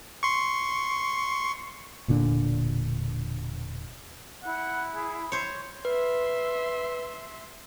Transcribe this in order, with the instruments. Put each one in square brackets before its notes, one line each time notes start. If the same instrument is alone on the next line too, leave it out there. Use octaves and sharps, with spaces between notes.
[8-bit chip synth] C6 C#6
[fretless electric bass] E1 A#2 D3 D4
[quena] E4 [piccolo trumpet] F#5
[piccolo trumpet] G#4
[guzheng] C5 C#5 [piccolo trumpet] C6
[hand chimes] B4 [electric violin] E5 C6